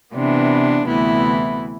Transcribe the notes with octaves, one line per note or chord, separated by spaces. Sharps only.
C3 E3 B3 D4
D2 C3 E3 B3 E4